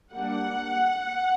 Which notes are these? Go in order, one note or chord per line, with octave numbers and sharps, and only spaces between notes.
G3 A#3 D4 F#5